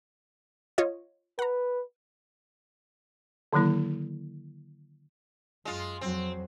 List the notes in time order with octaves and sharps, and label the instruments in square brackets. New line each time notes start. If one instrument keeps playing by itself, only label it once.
[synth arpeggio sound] F4 C#5 D#5
[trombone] B4 [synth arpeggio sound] F#5 A#5
[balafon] D3 D#3 F#3 A#3 E4
[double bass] F#2 [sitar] G#3 F4
[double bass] F2 F#3 [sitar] C4